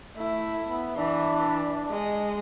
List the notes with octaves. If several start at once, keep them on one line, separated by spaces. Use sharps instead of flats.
A3 E4
B3
E3 D4
G#3